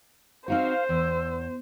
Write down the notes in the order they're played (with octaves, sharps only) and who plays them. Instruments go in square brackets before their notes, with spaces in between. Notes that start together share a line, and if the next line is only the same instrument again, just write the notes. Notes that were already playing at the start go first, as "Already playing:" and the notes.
[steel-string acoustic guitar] C4 D#4 F#4 [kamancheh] C5 [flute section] F5
[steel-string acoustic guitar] E2 [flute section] E6